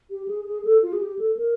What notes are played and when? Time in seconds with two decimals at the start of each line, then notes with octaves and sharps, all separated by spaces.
0.10 G4
0.28 G#4
0.45 G#4
0.65 A4
0.82 F4
0.93 G#4
1.01 G4
1.19 A4
1.37 A#4